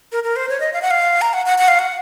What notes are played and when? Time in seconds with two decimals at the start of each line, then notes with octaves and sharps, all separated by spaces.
0.12 A#4
0.24 A#4
0.36 C5
0.49 C#5
0.60 D#5
0.73 F5
0.82 F#5
0.90 F5
1.21 A#5
1.33 F#5
1.46 F#5
1.58 F#5
1.68 F5
1.79 F#5